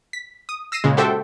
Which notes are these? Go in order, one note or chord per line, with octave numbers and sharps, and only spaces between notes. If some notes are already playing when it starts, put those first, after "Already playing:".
B6
D#6
E6 A#6 C7 D#7 E7
A#2 C#3 G#3
F#4 G4 A4 C5 E5 G5